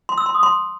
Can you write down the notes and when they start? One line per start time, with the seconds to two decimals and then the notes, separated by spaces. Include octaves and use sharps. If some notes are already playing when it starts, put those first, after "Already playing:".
0.09 C6
0.18 E6
0.26 C6
0.34 D#6
0.43 C6